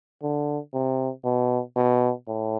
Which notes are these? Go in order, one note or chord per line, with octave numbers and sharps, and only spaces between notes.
D3
C3
B2
B2
A2